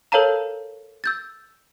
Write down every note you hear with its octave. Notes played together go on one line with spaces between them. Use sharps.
A4 A#4 C#5 F5 A5 A#5
E6 G6 A6